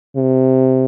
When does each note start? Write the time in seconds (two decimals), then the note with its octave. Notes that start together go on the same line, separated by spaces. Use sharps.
0.16 C3